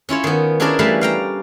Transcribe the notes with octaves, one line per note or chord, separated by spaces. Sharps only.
C#4 E4 F4 C#5
D#3 B3
C#4 D4 E4 G#4 A#4 D5
E3 G3 A3 F5 B5
F5 G5 A#5